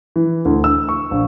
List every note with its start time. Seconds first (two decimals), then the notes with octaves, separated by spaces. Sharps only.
0.16 E3
0.45 D2
0.64 E6
0.89 C#6
1.11 A#1